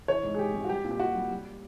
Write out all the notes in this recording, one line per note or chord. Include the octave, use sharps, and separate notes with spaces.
E3 C#5
G#2
G#4
G#2 G4
G#3
F#4
G3 G4
A#2
G4
A#2 F#4
G3
G3